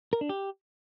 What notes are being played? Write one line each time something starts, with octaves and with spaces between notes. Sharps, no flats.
A#4
D4
G4